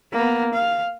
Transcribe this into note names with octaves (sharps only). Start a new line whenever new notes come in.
A#3 B3
F5